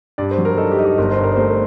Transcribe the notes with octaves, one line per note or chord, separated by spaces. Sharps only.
G2 D5
C5
F#3
A#4
D#4 A4
G4
D#4
G4
G1 A#4
C5
G2
A#4
A3 C5
A#4